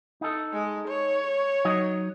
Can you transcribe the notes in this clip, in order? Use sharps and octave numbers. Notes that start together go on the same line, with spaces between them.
D#4 A4
G#3
C#5
F#3 D#4 D#5